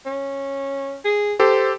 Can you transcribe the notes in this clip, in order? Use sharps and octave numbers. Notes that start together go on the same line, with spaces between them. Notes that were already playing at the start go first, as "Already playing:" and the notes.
C#4
G#4
G4 A4 C5